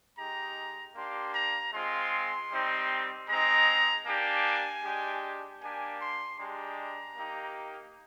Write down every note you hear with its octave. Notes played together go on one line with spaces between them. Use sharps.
G#3 D#4 G4 A#5
A#3 D4 G4 C6
A#5
G#3 C4 F4 C6
G3 C4 D#4
G#3 C4 D#4 A#5
A#3 D4 G4 G#5
G#3 D4 G4
A#3 D4 G4 G#5
C6
G#3 D4 G4 A#5
A#3 D#4 G4